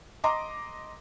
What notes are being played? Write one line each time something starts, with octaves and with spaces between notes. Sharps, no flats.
D#5 A#5 C6 D6